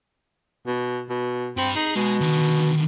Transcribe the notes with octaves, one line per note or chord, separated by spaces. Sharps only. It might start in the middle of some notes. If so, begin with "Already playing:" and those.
B2
B2
G2 C4 B5
D#4 G#4
B2 G#3
D3 D#3